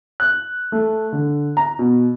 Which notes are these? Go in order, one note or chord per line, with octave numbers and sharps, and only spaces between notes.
F#6
A3
D3
A#5
B2